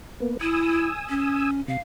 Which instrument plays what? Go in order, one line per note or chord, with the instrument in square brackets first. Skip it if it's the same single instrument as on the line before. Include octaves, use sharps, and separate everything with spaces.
[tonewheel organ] A#3 B3
[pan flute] E4 [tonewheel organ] G#5 D#6 E6
[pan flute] C#4
[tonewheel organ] C3 [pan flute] F5